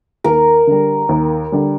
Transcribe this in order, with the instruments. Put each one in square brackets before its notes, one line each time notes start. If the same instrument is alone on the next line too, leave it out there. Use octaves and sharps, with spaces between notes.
[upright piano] D#2 [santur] A#4
[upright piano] D3 G3
D#2
D3 G3